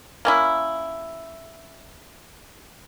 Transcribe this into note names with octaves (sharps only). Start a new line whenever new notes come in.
A#3 C#4 E4